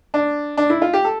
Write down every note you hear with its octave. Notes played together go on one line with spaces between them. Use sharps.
D4
D4
E4
F4
G4
A4